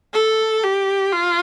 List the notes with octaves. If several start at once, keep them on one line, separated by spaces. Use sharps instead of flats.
A4
G4
F4